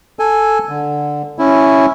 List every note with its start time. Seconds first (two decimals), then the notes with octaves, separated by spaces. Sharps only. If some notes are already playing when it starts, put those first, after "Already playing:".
0.19 A4 G#5
0.69 D3
1.39 C#4 E4